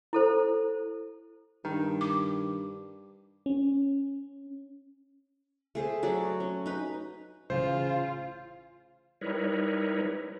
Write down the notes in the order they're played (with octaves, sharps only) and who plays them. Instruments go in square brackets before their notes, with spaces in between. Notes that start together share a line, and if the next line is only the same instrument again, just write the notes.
[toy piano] E4 A4 C5
[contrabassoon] G2 [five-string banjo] D#3
[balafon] D6
[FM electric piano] C#4
[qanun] A3 G#4 C5
F#3 F#4 A4 D5
C#4
D#4 B4
[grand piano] A1 C#3 [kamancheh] F4 [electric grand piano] C5
[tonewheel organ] G3 D#4 E4 A#4 B4 C#5